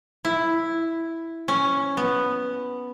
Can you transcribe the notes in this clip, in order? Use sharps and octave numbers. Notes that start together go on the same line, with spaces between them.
E4
C#4
B3